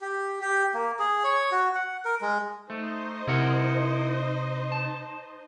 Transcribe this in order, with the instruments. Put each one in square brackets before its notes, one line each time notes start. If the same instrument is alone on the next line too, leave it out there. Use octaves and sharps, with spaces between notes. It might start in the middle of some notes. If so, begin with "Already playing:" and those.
[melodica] G4
G4
A#3
G#4
C#5
F#4
F#5
A#4
G#3
[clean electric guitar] A3 [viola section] D#4 C5 D#5
[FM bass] C3 [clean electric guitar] E4 A#4 F#5
[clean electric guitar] A5